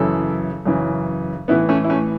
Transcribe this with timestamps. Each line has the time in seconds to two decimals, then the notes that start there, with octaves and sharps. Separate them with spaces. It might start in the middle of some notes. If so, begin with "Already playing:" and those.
Already playing: F#2 C#3 E3 E4 A4
0.66 F#2 C#3 E3
1.48 A2 E3 B3 E4
1.69 A3 C#4
1.84 E4
1.90 A3 C#4